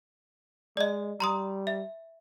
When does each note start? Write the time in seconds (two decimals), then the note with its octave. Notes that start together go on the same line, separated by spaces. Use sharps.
0.77 G#3 D5 D#5
1.20 G3 A#5 C6 D#6
1.67 E5